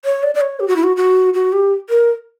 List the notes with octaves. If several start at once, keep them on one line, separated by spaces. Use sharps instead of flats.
C#5
D5
D5
C#5
G4
F#4
E4
F#4
F#4
F#4
G4
A#4